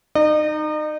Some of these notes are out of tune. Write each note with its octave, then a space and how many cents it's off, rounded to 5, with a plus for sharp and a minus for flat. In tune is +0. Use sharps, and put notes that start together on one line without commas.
D#4 -15 D#5 -40